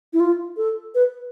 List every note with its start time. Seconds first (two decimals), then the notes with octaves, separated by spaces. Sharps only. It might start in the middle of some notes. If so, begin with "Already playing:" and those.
0.13 E4
0.20 F4
0.57 A4
0.95 B4